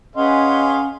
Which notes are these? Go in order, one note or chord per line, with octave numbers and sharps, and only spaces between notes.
C#4 G#4 B4 C#5 D#5 F5 F#5 C6